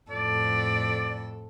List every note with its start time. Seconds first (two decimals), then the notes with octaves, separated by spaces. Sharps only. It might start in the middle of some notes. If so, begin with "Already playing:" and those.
0.10 F2 A2 A4 D5